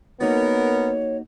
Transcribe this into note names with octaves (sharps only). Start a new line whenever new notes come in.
A#3 B3 D#4 F#4 A#4 C#5